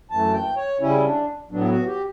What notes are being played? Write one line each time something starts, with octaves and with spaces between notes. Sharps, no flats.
F#2 E3 A3 A5
G5
C#5
C#3 G3 C#4 E4
D4
A2 F#3 B3 D4
E4
F#4
G4